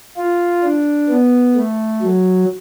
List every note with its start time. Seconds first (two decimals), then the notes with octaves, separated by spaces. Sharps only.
0.17 F4
0.64 D4
1.09 B3
1.56 A3
2.02 F#3